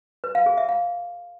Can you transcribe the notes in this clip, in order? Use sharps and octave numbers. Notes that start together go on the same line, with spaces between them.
B4
F5
G#4
E5
F5